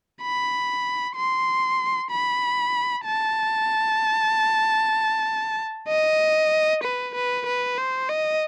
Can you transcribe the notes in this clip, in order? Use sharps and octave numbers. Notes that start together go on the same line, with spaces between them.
B5
C6
B5
A5
D#5
B4
B4
B4
C5
D#5